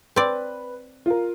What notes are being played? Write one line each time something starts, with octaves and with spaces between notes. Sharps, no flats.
C4 B4 D5
F4 A#4